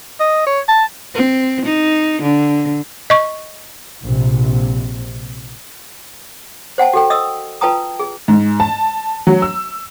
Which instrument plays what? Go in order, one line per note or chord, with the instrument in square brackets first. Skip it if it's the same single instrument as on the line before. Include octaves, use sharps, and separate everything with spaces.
[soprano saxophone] D#5
C#5
A5
[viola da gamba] C4
D#4
D3
[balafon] D#5 C#6
[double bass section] A#1 C3
[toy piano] C5 F#5 G5 A5
F#4 A4 G5
D#5 D#6 E6
F4 B4 G5 A5 A#5 D#6
G#4
[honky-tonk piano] G#2
A5
F#3
E6